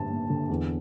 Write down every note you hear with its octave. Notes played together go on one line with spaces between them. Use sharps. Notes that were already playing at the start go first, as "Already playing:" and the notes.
Already playing: G2 D3 G3 A#3 A5
A#3
D3
E2